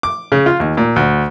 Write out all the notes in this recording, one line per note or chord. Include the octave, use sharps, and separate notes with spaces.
D6
C#3
F4
D#2
A#2
D2